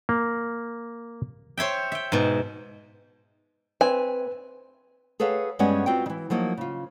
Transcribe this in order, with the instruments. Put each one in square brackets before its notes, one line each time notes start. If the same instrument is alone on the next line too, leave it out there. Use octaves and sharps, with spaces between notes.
[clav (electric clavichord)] A#3
[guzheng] C5 C#5 E5 G5
E5 G5
G#2 B2
[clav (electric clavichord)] C4 [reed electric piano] B4 [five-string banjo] G#5
[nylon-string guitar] G#4 A4 B4 C#5 F5 F#5
G2 G#3 B3 C#4 G4 F#5
C4 F4 F#4 B4 G5
D#3 E3
F3 F#3 A#3 D#4
C#3 F4